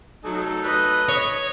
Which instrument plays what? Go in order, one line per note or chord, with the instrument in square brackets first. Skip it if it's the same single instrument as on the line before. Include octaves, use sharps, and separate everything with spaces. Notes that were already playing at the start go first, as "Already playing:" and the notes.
[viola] F#3 [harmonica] A3 D#4 A4
[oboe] B4 [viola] D#5
[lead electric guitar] C#5